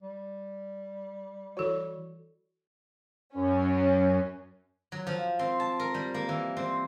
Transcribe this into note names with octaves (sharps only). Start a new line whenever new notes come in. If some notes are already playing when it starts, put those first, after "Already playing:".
G3
E3 F#4 A4 C#5
F#2 C#4
F#3
F3
C4
A5
A#4
G3
A#3
E3
C4